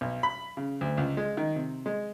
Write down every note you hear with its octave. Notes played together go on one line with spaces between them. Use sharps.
B1
B5
C#3
D2
C#2
G#3
D#3
C3
G#3